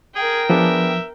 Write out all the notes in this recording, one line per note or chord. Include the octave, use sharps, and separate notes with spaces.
G#4 A#4 G5
F3 B3 D4 G#4 E5